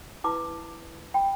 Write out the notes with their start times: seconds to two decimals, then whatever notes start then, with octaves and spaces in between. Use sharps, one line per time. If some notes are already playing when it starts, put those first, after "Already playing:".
0.24 E4 B4 A5 D6
1.14 G5 B5